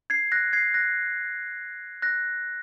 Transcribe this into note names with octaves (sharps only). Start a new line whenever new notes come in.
G#6 C7
F#6 A#6
G#6 C7
F#6 A#6
F#6 A#6